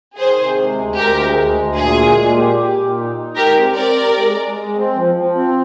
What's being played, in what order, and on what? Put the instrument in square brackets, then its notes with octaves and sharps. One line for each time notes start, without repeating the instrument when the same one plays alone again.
[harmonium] D#3 [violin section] G#4 C5
[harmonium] C3
G#3
D2
[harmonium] D2 [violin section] G4 A#4
[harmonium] G#3
D2
D2
[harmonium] A#2 [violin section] G#4
[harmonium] G#3
A#2
G4
G4
A#2
D#4
D#4
[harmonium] G#3 [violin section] G4 A#4
[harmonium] C4
[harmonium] C4 [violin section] A#4 D5
[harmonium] G4
G#3
G#3
G#3
C4
F3
F3
C4